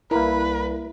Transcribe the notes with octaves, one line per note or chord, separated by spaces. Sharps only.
C2 A#3 E4 A#4 B4